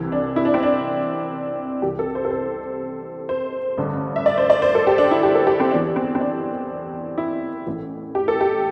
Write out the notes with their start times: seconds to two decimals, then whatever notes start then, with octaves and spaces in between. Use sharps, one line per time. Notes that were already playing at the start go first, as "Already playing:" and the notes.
Already playing: C2 C3 E3
0.12 D4
0.36 E4
0.45 D4
0.54 C4
0.63 D4
1.82 C2 C3 E3 G4
1.99 A4
2.15 C5
2.25 A4
2.31 C5
3.29 C5
3.77 A1 G2 D3
4.16 E5
4.26 D5
4.38 C5
4.50 D5
4.62 C5
4.75 A4
4.87 G4
4.98 D4
5.11 E4
5.23 G4
5.35 A4
5.47 G4
5.60 C4
5.71 E2 E3 D4
5.96 C4
6.15 C4
6.20 D4
7.18 E4
7.67 A1 A2 E3
8.15 G4
8.28 A4
8.41 G4